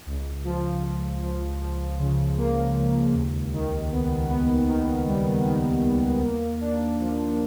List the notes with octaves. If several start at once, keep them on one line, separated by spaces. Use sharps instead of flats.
C#2
F3
F3
F3
F3
C#3
A#3
C#2
D#2
D#3
B3
B3
D#3
G3
D#3
D#2
A#3
D4
F3